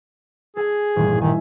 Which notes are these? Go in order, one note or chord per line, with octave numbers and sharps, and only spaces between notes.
G#4 A4 G#5
D#1 A1 G2
D#3 E5 G#5